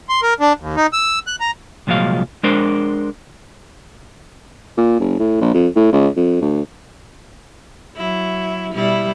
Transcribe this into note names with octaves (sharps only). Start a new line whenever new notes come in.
C6
A#4
D4
D#2
D#4
E6
F#6
A#5
C2 A#2 F3 F#3 G#3 F5
G#3 D4 A#4 C5
A#2
F#1
A2
A#1
F2
A2
C#2
F2
D2
F#3 E4
B2 G3 E4